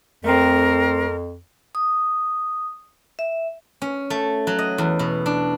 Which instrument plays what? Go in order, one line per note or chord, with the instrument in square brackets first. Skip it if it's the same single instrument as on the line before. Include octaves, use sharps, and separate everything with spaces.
[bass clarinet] F2 [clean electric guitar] A3 C4 [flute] A#4
[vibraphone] D#6
E5
[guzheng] C#4
A3
F#3
D#5
E2
B2
D4